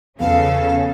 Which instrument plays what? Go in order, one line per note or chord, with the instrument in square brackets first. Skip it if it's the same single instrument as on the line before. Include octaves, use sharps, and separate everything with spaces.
[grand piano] E2 F3 B3 [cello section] C#3 C#4 A4 [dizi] F5